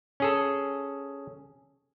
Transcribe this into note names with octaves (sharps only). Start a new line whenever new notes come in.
C#4 G#4 A4